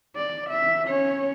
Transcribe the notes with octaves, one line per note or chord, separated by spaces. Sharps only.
D5
E5
C#4 C#5